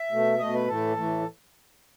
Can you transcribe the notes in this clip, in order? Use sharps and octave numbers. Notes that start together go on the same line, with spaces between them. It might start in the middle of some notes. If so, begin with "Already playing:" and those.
Already playing: E5
B2 A3
B2 A3 D#5
B4
A2 E3 A3 A4
A2 E3 A3